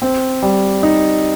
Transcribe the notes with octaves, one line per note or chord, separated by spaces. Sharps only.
C4
G3
D#4